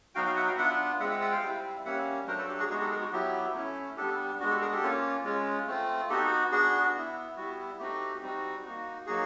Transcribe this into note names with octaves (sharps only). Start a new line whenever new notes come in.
F#3 B3 D#4 F#4 F5 G5
F5 G5
E5 F#5
F5 G5
B3 D4 F4 E5 F#5
G#3 C4 F4 E5 F#5
E5 F#5
E5 F#5
F5 G5
G3 C4 E4
G3 A#3 C#4 E5 F#5
F#3 A3 D4 A#4 C5
A4 B4
G4 A4
F#4 G#4
G#3 B3 D#4 F#4 G#4
G4 A4
G#4 A#4
F#4
F#3 B3 E4 G4
A3 C#4 E4
G3 B3 D4 G4 A4
G#3 B3 D4 F#4
G4 A4
G#4 A#4
G4 A4
A#3 C#4 F4
G#3 C#4 F4
A3 C4 F4
B3 D#4 F#4 G4 A4
B3 D4 F#4 G#4
B3 E4
G3 B3 E4 F#4
A3 C4 D#4 F#4 G4
G3 C4 D#4 F#4
A#3 D#4 F#4
F#3 A#3 D#4 F#4 G#4